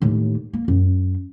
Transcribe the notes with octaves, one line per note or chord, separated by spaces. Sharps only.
D#2 A2
A#3
F#2